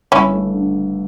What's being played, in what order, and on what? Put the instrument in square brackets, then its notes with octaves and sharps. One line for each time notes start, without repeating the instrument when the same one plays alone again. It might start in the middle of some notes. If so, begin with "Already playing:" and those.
[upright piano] G1 [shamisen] C#4 E4
[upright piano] A3
D3